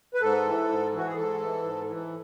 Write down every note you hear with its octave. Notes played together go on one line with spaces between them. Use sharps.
B4
G#2 A4
E3
G#2
E3
F#4
G#4
G#2 A4
E3
G#2
E3